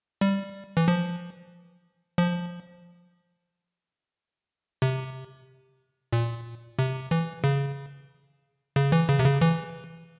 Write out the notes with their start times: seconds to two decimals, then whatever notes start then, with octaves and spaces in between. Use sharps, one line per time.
0.21 G3
0.77 E3
0.88 F3
2.18 F3
4.82 C3
6.13 A#2
6.79 C3
7.11 E3
7.44 C#3
8.76 C#3
8.92 E3
9.09 C#3
9.19 C3
9.24 C#3
9.41 E3